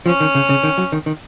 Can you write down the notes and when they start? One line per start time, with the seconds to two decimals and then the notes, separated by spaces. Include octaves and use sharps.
0.06 F3 C#4
0.21 D#3
0.35 C#3
0.49 C#3
0.64 D#3
0.78 F#3
0.92 D#3
1.06 D#3